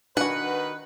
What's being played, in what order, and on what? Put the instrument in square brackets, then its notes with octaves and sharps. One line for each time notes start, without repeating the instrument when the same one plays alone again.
[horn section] D#3 B4 [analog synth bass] D4 [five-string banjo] F#4 G#5 [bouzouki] F#5